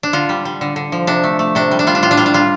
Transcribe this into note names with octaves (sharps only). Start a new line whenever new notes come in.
D4
D3 F4
G3
G3
D3
D3
F3
C3 D4
A3
A3
C3 D4
G3
D4
G3 F4
D4
A2 F4
D4
G3 F4
D4
G3 F4